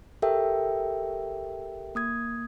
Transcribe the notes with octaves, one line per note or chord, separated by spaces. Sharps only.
G4 A4 A#4 E5 G5
A#3 D#6 G#6